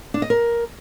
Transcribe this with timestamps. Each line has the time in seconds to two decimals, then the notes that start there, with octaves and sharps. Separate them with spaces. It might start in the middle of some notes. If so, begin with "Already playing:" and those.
0.14 D4
0.22 D#5
0.30 A#4